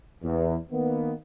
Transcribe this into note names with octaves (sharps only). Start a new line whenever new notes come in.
E2
D#3 A#3 B3